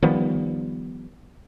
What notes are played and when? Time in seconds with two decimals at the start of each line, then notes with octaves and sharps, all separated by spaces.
0.03 D#3 F3 G3 B3